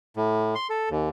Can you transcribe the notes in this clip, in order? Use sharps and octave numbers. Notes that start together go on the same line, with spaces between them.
A2
C6
A4
D#2